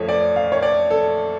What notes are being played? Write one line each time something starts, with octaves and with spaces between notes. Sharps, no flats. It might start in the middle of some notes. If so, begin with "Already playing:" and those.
Already playing: F2 F3 A3 A4 C#5
D5
F5
C#5
D5
A4